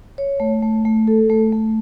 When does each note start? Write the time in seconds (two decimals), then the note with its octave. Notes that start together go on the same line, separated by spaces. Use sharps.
0.18 C#5
0.40 A3
0.62 A3
0.85 A3
1.08 A4
1.30 A3
1.52 A3